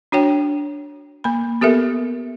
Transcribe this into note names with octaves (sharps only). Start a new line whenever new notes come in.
D4 F#4 C#5 G5
A#3 B5
B3 G4 A4 A#4 E5